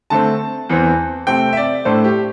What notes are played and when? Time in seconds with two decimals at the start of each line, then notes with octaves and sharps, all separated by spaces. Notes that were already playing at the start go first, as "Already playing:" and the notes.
0.10 D3 A3 C4 A5
0.69 E2 E3 C4
1.27 C3 A3 C4 G5
1.53 E5
1.57 D5
1.85 A2 A3 D4 C5
2.04 G4